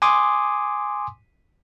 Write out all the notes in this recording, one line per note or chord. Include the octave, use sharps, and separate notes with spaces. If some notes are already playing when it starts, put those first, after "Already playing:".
G#5 C6 D6 D#6